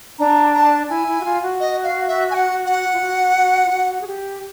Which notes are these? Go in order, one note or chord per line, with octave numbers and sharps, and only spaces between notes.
D4 A#5
A#5
A5
E4 G#5
E4
F#4
F4
F#4
D#5
F5
E5
G#5
F#5
F#5
F4
F#4
F#4
F4
F#4
G#4
G4